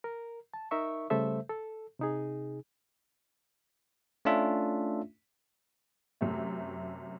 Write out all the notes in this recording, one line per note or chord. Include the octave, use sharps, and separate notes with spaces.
A#4
A5
D#4 A#4 E5 C#6
C#3 G3 A3 A4 C5 E5
A4
C3 D#4 G#4
A3 C#4 D4 F4 E5
F#2 C3 A3